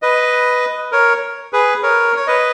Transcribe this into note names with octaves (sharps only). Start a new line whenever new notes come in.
B4 D#5
A#4 C#5
G#4 B4
A#4 C#5
C#5
B4 D#5